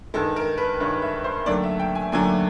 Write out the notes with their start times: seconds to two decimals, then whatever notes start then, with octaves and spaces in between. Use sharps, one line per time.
0.14 G2 D#3 G#3 A4
0.36 A#4
0.58 B4
0.80 G2 D#3 G#3 C#5
1.02 E5
1.24 C5
1.46 D#2 D3 F#3 A3 D5
1.64 E5
1.80 G5
1.95 G#5
2.12 D#2 D3 F#3 A3 G#5